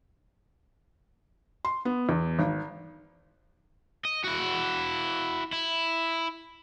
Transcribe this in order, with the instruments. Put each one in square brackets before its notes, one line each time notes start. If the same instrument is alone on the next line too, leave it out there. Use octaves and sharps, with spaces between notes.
[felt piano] C6
B3
E2
G#1
[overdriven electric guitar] D#5
E4 F#4
E4